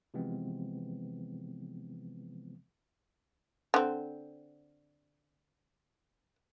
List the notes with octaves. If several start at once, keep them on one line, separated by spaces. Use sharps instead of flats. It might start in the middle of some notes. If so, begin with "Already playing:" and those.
C3 E3 F3 G#3 B3 C4
D3 C4